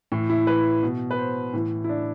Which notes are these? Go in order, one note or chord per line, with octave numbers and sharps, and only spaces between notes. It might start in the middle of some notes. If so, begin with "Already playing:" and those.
A2 E3
E4
B4
B2
B4
C5
A2 E3
E4
D4